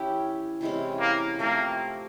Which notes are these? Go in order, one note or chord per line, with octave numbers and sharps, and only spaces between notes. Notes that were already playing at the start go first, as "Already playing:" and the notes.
Already playing: E3 C#4 E4 G4
C3 E3 G#3 C#4
A#3
F3 A3 A#3 C4